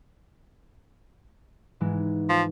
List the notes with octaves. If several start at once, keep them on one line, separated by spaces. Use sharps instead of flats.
G#2 E3 G#3
F3